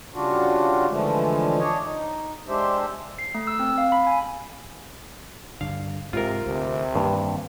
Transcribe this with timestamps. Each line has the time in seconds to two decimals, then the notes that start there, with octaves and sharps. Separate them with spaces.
0.14 C#3 G3 D4 F4 F#4
0.90 D3 E3 F3 G#3 A3
1.59 D4 C#5 D#5
1.85 D#4
2.48 G#3 D4 G4 C5 E5
3.19 C7
3.35 A3
3.47 E6
3.59 C4
3.78 F5
3.92 B5
4.07 G#5
5.61 G2 D3 F5
6.13 G#2 C3 F4 A#4
6.46 D2 C3
6.95 G2 D#3 A#3 C4